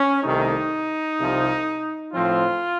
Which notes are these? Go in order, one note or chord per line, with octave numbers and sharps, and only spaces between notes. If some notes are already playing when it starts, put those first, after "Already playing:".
Already playing: C#4
C2 C3 D#3 A3 D#4
C2 C3 F3
A2 F3 C4 F4